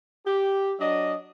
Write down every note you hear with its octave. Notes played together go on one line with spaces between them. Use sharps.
G4
F#3 D4 D#5